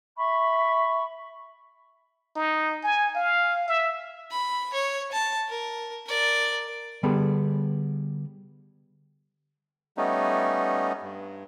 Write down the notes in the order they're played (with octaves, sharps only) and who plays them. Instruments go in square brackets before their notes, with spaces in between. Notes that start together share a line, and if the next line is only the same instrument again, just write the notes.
[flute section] E5 B5 C#6
[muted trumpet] D#4
G#5
F5
E5
[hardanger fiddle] B5
C#5
A5
A#4
A#4 D5
[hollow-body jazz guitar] D3 G3 B3 G#4 A4 B5
[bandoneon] G3 A3 B3 C#4 D#4
G2